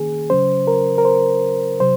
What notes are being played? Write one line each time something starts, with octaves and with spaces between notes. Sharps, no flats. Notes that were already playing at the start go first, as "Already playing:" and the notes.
Already playing: D#3 A#3 C#4 G#4
C#3 F#3 C#4 C5
A#4
A#4
C5
C3 F#3 C5